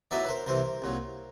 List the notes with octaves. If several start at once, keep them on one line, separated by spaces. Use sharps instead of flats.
A2 F#3 B3 D#4 D5 E5
B4
A#4 C5
C2 C3 E3 A#4 C5
C2 A#2 F#3